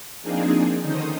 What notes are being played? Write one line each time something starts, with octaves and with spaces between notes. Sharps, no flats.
F3 A#3 C4 D4 D#4 G#4
D3 D#3 C#4 D#4 C5 D#6